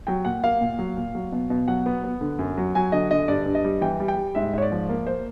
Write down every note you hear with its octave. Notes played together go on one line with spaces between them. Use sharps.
F#3 G5
A#2 F#5
A#3 F5
A#2
F#3
A#2
F#3
B2
B2
F#3 F#5
B3
B3
D3
F#2
F#3
F#3 G#5
D3 D#5
D3 D#5
G2 D5
G2
D#5
G3
E3 G5
G3
G5
G3
G#2 E5
G#2 C#5
D5
F3
A#3
A#3 C5